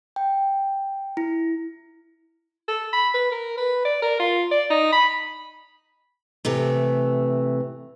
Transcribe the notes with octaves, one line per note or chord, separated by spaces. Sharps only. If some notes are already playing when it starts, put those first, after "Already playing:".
G5
E4
A4
B5
B4
A#4
B4
D5
A#4
F4
D5
D#4
B5
C3 E3 A3